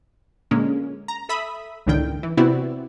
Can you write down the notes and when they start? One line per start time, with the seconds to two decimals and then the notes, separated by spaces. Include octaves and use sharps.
0.51 A#2 D3 G#3 A#3 C#4
1.08 A#5
1.29 A4 E5 B5 D#6
1.87 G1 C#2 A2 D3 D#3 G5
2.23 E3
2.37 C3 B3 C4 E4 F#4 D5